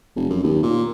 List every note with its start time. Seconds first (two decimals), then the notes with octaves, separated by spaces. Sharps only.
0.16 F1
0.30 F#2
0.43 D#2
0.63 A#2